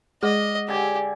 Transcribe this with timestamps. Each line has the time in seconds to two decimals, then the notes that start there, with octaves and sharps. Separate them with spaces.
0.23 G#3 G#4 D#5 F#5 D6
0.68 D3 G4 G#5